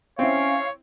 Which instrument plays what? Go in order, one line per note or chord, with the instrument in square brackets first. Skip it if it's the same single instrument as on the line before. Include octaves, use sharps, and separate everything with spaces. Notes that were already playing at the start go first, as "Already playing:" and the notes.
[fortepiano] C4 E4 [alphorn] C#4 [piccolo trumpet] C#5 [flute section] F5